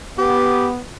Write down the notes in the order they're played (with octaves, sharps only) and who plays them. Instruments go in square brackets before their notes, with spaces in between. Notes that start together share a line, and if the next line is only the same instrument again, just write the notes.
[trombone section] B3 [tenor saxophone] G4